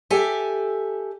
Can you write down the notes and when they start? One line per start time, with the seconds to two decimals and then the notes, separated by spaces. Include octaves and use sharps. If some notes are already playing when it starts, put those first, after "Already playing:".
0.10 G4 A4 E5 G#5